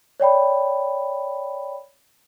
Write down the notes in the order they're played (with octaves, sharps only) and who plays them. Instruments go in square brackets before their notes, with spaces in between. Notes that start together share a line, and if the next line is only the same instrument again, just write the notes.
[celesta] C#5 D5 G5 B5